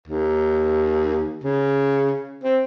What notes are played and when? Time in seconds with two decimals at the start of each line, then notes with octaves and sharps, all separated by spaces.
0.08 D#2
1.44 C#3
2.44 C4